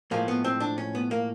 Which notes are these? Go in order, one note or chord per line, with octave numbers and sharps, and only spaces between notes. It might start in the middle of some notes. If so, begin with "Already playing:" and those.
A2 F3 G#3 A#3
B3
C4
D4
C#4
B3
A#3